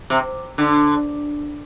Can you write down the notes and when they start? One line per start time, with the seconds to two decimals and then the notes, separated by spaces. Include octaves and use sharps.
0.10 C3
0.58 D3